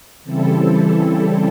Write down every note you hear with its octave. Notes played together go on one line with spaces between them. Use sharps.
C#3 E3 G3 C4 E4 A4